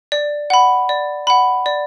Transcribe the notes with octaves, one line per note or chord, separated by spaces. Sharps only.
D5
F#5 B5
D5
F#5 B5
D5